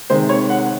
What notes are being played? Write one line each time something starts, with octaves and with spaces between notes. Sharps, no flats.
C3 D#3 G#3 C5
C#5
F#5